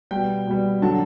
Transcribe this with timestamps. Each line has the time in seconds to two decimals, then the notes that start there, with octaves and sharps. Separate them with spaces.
0.11 B2 G3 G5
0.47 B2 G3
0.82 D3 F#3 A5